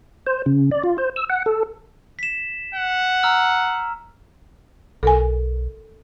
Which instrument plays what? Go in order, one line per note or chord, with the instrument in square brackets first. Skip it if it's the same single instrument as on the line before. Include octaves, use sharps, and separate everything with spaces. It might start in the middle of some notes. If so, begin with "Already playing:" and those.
[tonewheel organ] C5
C#3
D5
F4
C5
E6
F#5
A4
[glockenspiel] B6 E7
[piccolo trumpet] F#5
[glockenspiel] A#5 E6 F6
[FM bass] B1 [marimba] A4 A#4 G#5